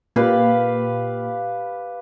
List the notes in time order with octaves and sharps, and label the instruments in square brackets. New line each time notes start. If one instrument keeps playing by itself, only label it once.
[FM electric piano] A#2 [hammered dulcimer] G4 B4 F5